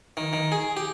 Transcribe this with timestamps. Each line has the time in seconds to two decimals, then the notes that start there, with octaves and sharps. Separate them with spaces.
0.17 D#3
0.33 D#3
0.52 G#4
0.77 G4